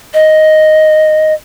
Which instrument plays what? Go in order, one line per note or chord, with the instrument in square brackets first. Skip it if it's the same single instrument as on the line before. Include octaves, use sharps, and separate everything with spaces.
[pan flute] D#5